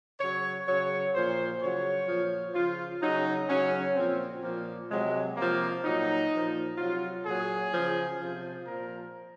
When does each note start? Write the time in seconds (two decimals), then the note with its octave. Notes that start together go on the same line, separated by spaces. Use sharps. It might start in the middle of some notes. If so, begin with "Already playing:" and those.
0.20 C#3 F#3 C#5
0.66 C#3 F#3 C#5
1.14 A#2 F3 C5
1.61 C#3 F#3 C#5
2.08 A#2 F3
2.55 C#3 F3 F4
3.02 C#3 F#3 D#4
3.48 C#3 F#3 C#4
3.96 A#2 F3 C4
4.43 A#2 F3 A#3
4.90 C3 F#3 G#3
5.36 C3 F3 A#3
5.83 A#2 F#3 D#4
6.31 A#2 F3
6.77 C3 F#3 F4
7.25 A#2 F#3 G#4
7.72 C#3 F3
8.18 C3 F3
8.66 A#2 F3 A#4